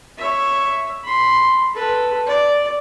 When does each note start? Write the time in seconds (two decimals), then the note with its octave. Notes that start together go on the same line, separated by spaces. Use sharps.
0.18 C#5 E5
1.04 B5 C6
1.75 A4 B4
2.26 D5